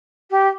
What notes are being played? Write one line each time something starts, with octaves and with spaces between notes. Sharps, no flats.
G4